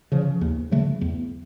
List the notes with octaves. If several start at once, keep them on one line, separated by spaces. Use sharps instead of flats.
C#3 F3
D#2
C#3 F#3 A3
E2